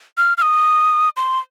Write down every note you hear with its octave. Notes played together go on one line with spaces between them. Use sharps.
F6
F6
D#6
C6